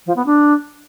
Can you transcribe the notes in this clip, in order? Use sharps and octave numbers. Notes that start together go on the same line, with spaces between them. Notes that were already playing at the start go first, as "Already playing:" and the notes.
F3
B3
D4